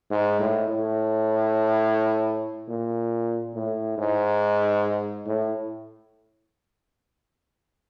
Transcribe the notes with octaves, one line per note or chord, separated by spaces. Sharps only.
G#2
A2
A2
A#2
A2
G#2
A2